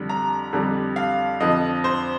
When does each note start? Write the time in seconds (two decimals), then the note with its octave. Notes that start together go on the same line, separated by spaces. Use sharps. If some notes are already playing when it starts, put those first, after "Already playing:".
Already playing: F2 D3 G3
0.09 A#5
0.53 F2 D3 G3
0.96 F5
1.40 F2 D3 F3 D#5
1.84 C5